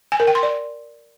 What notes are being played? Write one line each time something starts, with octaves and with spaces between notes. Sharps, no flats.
G#5
A#4
G5
C6
D5